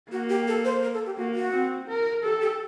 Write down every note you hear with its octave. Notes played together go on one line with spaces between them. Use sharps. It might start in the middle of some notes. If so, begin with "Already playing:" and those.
A#3 F#4
G4
A4
C5
A#4
A4
G4
A#3 F#4
F#4
C4
A#4
G4 A4
G4